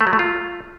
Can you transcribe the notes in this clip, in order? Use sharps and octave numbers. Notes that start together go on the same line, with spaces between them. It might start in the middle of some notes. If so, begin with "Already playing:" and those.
A3
F#3
A3
F4